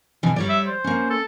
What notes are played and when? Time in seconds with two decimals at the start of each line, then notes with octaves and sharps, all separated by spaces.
0.23 B2 D3 E3
0.36 G3 C#5 D5
0.49 E5
0.67 C5
0.84 A#3 C#4
1.10 A4